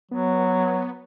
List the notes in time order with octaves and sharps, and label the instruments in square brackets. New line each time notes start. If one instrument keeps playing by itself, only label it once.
[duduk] F#3 [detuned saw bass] B3